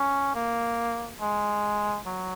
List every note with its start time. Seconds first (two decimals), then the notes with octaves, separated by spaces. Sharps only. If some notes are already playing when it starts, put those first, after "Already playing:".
Already playing: C#4
0.35 A#3
1.21 G#3
2.06 F#3